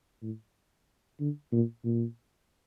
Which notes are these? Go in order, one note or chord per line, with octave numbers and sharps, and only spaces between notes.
A2
D3
A#2
A#2